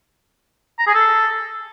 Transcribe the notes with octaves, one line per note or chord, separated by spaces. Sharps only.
A#5
G#4
A4